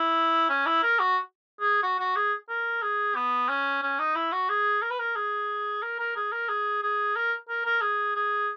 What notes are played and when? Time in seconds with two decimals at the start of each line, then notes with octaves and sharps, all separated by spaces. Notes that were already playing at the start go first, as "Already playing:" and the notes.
Already playing: E4
0.50 C#4
0.66 E4
0.83 A#4
0.99 F#4
1.60 G#4
1.83 F#4
1.99 F#4
2.16 G#4
2.49 A#4
2.82 G#4
3.15 B3
3.49 C#4
3.82 C#4
3.99 D#4
4.15 E4
4.32 F#4
4.49 G#4
4.82 A#4
4.90 B4
4.99 A#4
5.16 G#4
5.82 A#4
5.99 A#4
6.16 G#4
6.32 A#4
6.49 G#4
6.82 G#4
7.16 A#4
7.49 A#4
7.65 A#4
7.82 G#4
8.15 G#4